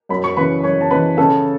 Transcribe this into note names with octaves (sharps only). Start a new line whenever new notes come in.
F#2 B5
C#6
C#3 E3 B4 B5
F#2 C#5 C#6
A5
C#3 E3 B4 B5
C#3 A4 A5